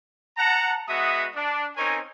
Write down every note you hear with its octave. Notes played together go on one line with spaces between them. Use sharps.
F#5 A5 A#5
G#3 B3 F#4 E5 D#6
D4
C4 C#4 D#4 A#4 C#5 G#5